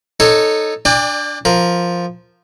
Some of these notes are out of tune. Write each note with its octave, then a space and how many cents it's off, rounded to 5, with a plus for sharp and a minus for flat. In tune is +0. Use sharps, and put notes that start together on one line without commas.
D#4 -15 A4 +0 C#5 +0
D4 +0 D5 +25 G5 +45
F3 +0 A#4 +0